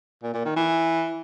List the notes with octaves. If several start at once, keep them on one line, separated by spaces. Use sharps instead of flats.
A#2
A#2
D#3
E3